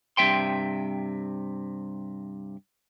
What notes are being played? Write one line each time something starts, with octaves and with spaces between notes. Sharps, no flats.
G2 C3 A3 E5 G5 C6